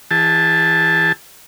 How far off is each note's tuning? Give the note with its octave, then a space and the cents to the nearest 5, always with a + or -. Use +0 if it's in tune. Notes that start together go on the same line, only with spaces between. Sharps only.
E3 +0 G#4 -40 A5 -5